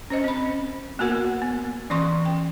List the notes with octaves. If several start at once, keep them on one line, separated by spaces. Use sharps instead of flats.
C#4 C5 D#5
C4 B5
A#3 B3 F#4 A#4 F#5
B3
E3 C#4 C6 C#6
G5